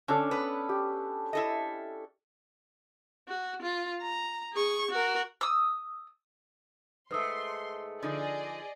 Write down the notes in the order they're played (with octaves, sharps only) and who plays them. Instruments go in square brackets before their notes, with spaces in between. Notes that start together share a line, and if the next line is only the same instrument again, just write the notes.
[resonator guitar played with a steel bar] D3 [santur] C#4 D4 A4
[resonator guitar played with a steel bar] B3 B4
[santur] G4
[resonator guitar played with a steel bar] E4 A4 D#5
[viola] F#4
F4
A#5
G#4 C#6
F#4 A#4
[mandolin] D#6 E6
[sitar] G#2 A3 [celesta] B4 D#6 E6 [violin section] C6
[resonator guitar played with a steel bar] D3 F3 D#4 [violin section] G#4 D5 D#5